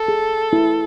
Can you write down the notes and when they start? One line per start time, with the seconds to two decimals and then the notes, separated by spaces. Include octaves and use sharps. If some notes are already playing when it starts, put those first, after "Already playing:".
Already playing: A4
0.08 G#4
0.53 E4